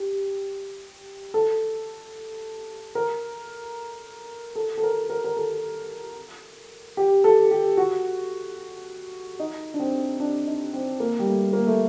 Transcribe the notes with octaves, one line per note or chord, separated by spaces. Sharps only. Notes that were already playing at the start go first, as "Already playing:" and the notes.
Already playing: G4
A4
A#4
A4
A4
A#4
A#4
A#4
A4
G4
A4
G4
F#4
D#4
D4
C4
D4
D#4
C4
A#3
G3
A3
A#3
A3